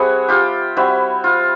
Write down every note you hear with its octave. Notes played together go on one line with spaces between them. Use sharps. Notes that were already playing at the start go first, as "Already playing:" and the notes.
Already playing: G3 C4 E4 F#4 G#4
F4 G4
G3 C4 E4 F#4
F4